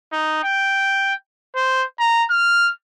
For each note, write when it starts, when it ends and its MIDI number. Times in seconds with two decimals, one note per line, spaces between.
0.13 0.40 63
0.44 1.14 79
1.56 1.84 72
2.00 2.25 82
2.31 2.72 89